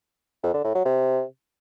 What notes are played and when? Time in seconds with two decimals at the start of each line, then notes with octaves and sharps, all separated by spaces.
0.43 F2
0.54 D3
0.64 A2
0.75 F#3
0.85 C3